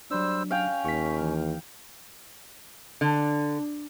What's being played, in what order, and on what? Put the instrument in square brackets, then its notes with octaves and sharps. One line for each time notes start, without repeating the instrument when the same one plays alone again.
[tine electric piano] F#3 D4 [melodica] G3 C5 E6
[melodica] C#4 [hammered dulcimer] F5 G5
[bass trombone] D#2 [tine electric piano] C#6 B6
[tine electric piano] E3
[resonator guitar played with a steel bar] D3